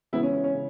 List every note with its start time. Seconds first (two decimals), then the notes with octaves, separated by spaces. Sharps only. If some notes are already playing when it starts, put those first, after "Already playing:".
0.13 C#3 E3 G#3 B3 E4
0.23 C#4
0.33 C#4
0.44 C#4
0.54 C#3